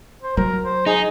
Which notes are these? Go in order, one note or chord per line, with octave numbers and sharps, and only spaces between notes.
C5
F#3 A#4
C5
D#4 G#4